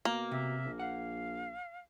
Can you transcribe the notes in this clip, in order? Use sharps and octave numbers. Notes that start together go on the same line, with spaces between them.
B2 A#3
C3 E5
A#1
F5 F#5